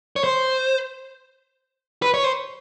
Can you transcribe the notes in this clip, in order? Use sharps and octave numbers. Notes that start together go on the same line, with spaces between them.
C#5
C5
B4
C#5
C5